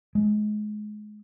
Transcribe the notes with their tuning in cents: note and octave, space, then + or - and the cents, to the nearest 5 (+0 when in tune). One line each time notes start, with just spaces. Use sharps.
G#3 +25